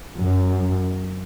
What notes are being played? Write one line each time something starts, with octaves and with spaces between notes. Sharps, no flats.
F#2